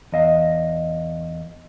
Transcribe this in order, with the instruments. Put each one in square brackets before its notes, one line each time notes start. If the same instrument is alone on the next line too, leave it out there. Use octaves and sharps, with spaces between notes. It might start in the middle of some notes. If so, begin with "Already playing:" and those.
[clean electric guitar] E2 D#5 F5